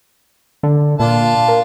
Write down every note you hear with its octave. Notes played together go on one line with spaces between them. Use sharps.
D3
A#2 D4 F4 A5
A#3